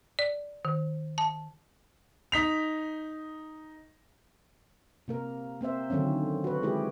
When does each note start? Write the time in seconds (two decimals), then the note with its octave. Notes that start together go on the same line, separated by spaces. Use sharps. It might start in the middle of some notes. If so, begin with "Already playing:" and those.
0.19 D5
0.65 D#3
1.18 A5
2.32 D#4 B6 F7
5.08 C3 A#3 A#4
5.61 A#3 C4 C5 E5
5.90 D3 D#3 F#3 C4 C#4
6.44 F#4 B4
6.62 G#3 E4 G4 G#4